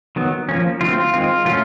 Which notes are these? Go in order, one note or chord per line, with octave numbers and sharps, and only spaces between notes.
D#3 F#3 B3
F3 A#3 C#4
D3 F#3 A3 C4 F4
D#3 G#3 C4 F4
F#3 A3 C#4 F4